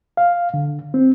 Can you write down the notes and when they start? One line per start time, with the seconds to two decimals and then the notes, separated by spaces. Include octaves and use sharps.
0.17 F5
0.54 D3
0.94 C4